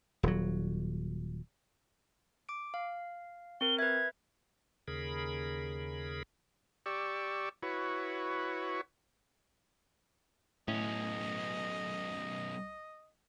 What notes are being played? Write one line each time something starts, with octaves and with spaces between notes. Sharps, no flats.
D#1 F#3
D6 D7
F5
C4 A#4 G7
B4 E5 G#6
D#2 C#3 G#4 A#4 B5
G4 D5 C#6 E6
E4 F#4 B4 C#5
B1 A2 C#4 D#5